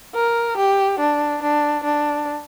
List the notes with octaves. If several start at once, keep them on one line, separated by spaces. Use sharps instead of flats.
A#4
G4
D4
D4
D4